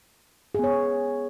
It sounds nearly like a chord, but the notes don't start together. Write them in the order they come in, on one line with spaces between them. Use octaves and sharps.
G#4 B3 C#5